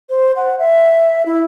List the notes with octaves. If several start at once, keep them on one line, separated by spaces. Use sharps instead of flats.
C5
F#5
E5
E4